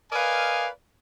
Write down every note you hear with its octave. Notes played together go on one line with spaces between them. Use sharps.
A#4 B4 D5 D#5 F5 G#5